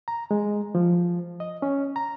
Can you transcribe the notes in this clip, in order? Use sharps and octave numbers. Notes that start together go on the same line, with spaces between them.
A#5
G#3
F3
D#5
C#4
A#5